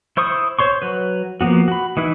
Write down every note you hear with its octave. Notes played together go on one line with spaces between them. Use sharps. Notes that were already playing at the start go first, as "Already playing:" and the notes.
E4 C5 C#6 D#6
C5 C#5 C6 C#6
F#3 B4
F3 A#3 B3 F#4
F#4 B5
E3 D#4 E4 B4